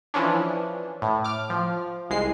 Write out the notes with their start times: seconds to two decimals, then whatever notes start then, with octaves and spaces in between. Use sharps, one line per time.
0.14 E3 F3 C#4 D4
1.02 A2
1.24 D6 F6
1.50 F3
2.10 C2 G#3 C7